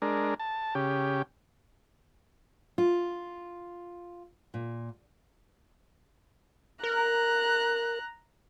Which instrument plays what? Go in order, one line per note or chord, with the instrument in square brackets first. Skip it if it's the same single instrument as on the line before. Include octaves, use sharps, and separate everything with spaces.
[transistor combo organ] G#3 D4 A#4
A5
C#3 G4
[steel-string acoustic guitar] F4
A#2
[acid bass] A#4 [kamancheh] A#5 F#6